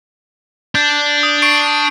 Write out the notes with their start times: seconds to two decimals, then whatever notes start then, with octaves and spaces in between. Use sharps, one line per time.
0.75 D4 G6
1.23 D#6
1.42 C#6 C7 D7